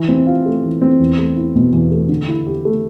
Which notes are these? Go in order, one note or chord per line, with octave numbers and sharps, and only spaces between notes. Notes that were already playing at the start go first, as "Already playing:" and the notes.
Already playing: E3
C4
F4
A3
E3
C4
E2
A3
E4
B2
E2
A3
D3
E4
G4
A3